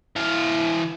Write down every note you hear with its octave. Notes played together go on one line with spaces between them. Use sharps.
E3 F5